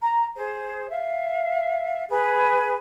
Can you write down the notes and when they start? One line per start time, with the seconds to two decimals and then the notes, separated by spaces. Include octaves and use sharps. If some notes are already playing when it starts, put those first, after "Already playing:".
0.01 A#5
0.35 G#4 C5
0.89 E5 F5
2.10 G#4 B4 B5